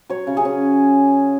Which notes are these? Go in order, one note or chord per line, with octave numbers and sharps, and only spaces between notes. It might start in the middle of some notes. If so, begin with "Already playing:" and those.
F#3 C#5
C#3
G#4
C#4